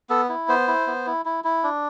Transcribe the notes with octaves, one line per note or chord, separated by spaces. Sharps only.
B3 A4
E4
B3 C5
E4
B3
E4
E4
E4
D4